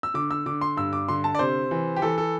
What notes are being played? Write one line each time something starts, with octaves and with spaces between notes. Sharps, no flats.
E6
D3 D6
E6
D3 D6
C6
G2 E6
D6
D3 C6
A5
D5
C3 C5
E3
G4
E3 A4
A4